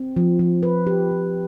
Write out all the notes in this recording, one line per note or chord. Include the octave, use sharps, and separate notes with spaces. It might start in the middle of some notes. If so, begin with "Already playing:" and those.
Already playing: C4
F3
F3
B4
G4
F3